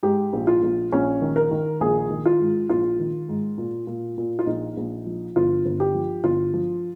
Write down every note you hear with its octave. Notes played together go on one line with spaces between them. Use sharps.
G#2 G4
A#1
F4
A#1
A#1 C#4
D#3
A#4
D#3
A#1 G#4
D#3
F4
G#2
A#1 F4
D#3
G#2
A#2
A#2
A#2
F4
A#1 D#4
A#1
F3
G1 F4
G1
G4
F3
G1 F4
F3